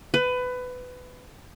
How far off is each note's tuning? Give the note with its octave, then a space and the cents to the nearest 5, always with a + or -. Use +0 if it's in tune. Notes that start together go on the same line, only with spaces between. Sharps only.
B4 +20